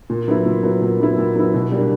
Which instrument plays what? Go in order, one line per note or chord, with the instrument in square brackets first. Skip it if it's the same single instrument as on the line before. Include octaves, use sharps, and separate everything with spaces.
[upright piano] A#2
F#3 B3 E4
A#2
F#3 B3 E4
A#2
F#3 B3 E4
A#2
F#3 B3 E4
B2
G3 A#3 D4